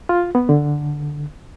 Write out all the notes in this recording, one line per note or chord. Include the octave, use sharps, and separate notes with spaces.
F4
B3
D3